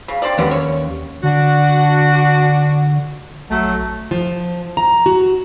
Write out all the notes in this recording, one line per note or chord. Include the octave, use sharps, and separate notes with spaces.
C#3
C4 D4 D5
D#2 D3 B3 C#4 D4
C#5
D3 D4 F#4
A#1 F#3 A3
F3
A#5
F#4